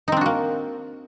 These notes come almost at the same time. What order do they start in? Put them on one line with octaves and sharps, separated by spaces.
D#4 C4 D4 F#4 A#3